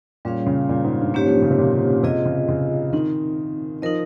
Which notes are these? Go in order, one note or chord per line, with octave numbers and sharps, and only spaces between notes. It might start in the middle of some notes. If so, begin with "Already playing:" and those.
A#2 G3 C#4 G#4 C#5 F5
C#3
A#2
G#2
G2
G#2 A#3 C#4 G4 C#5
F3
D#3
C#3
C3
A#2
C3 F4 G#4 D#5
C#3
C#3
D#3 C4 D#4 A#4
F3 D#4 A#4 D#5